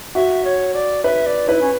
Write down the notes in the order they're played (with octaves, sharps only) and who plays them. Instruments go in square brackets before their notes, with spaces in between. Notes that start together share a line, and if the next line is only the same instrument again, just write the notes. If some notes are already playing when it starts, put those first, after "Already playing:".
[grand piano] F#4 [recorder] E5
[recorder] C#5
D5
[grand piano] B4 [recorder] E5
[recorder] D5
[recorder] E4 [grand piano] B4
[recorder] C#4